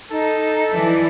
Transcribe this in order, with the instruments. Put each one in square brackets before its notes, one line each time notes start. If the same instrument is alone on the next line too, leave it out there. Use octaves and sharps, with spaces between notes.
[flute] D#4 [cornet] A4
[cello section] E3 [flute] D5